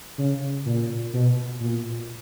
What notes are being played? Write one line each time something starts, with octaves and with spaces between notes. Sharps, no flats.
C#3
A#2
B2
A#2